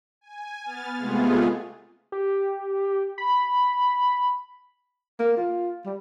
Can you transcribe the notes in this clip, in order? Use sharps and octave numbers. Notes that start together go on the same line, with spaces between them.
G#5
B3 F6 A6
C3 G#3 A3 B3 F4 G#4
G4
B5
A#3
F4
G3